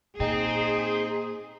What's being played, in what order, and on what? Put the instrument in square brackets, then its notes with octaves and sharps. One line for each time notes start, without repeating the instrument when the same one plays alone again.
[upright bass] A#2 [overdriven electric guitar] C4 [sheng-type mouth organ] D#4 [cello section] G#4